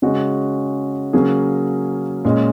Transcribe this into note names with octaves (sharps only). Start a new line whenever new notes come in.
C#3 G#3 C#4 F#4
C#3 F#3 A#3 C#4 G#4
A#2 G#3 C#4